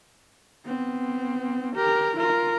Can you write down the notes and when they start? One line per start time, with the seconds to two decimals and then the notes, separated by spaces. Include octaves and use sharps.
0.65 B3 C4
1.76 G4 A#4
2.16 F4 A#4